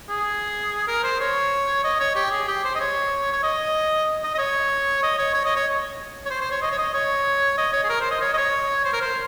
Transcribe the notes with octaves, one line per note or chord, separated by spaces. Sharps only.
G#4
A#4
C5
C#5
D#5
C#5
G4
G#4
G4
C5
D#5
C#5
C#5
D#5
D#5
D#5
C#5
D#5
C#5
C#5
D#5
C#5
C#5
C5
C5
C#5
D#5
C#5
D#5
C#5
D#5
C#5
G#4
A#4
C5
D#5
C#5
D#5
C#5
C5
A#4
C5